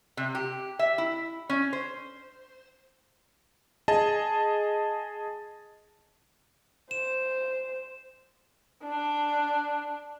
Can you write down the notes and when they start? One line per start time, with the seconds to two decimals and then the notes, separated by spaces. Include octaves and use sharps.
0.17 C3
0.35 G4
0.79 E5
0.98 E4
1.50 C#4
1.73 C5
3.88 G#4 D#5 A5
6.91 C5 E7
8.83 D4